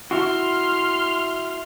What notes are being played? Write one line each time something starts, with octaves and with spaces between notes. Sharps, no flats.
E4 F#4 C6 F6